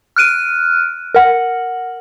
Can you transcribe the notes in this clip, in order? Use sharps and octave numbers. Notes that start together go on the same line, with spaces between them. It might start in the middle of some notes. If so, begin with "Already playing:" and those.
F6 F#6 D7 D#7
A#4 F#5